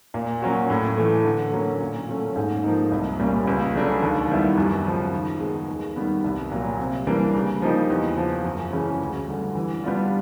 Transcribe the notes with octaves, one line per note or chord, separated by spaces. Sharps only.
A#2
F#3 A#3 C#4 F#4
A2
E3 A3
D3
F#3 A#3 C#4
A#2
F#3 A3 C#4
G#2
F3 A#3 D#4
C2
A#2 G3 A#3 C#4
C#2
C#3 F#3 A3 D4
D#2
D#3 G3 B3 E4
F#2
C#3 F3
D#3
G#3 B3
D#2
D#3 G3 B3
C2
A#2 F#3
C3
E3 G3 A#3 D4
C#3
F3 A#3 D#4 G4
E2
C#3 F3
F#2
C#3 E3 G#3 C#4
D2
D3 G3
E3
G3 B3 D4 F4